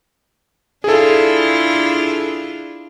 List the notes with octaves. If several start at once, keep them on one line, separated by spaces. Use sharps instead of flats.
D4 E4 F4 G#4 A4